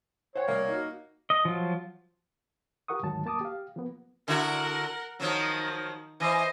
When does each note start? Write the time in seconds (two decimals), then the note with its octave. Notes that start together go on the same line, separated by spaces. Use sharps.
0.35 C5 C#5 F#5 G5
0.48 C2 A#3
0.68 D#4 F#4
1.30 D#5
1.45 F3 F#3 F4
2.88 F4 G4 A#4 F#5 C#6 D#6
3.03 D2 G#2 D#3 F#3 A5
3.26 A#3 A5 D6 D#6
3.41 G4 F5
3.76 F3 A#3 B3
4.28 D3 E4 F#4 A#4 F#5
5.20 D#3 F3 F#3
6.20 E3 C5 D#5